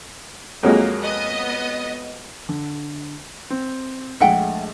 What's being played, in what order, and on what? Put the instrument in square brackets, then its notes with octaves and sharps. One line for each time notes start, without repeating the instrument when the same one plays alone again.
[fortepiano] F2 F#3 G#3 [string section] A#3
[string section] B3 D#5
[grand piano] D3
C4
[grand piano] A#1 G#3 A3 [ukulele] E5 F#5 G5